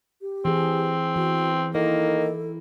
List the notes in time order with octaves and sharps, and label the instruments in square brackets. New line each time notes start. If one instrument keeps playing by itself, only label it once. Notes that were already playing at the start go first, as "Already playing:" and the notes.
[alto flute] G4
[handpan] E3 G#4 [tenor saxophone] C4
[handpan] E3 [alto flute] F#4
[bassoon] D#3 [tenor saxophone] A#3 [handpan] E4 [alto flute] A4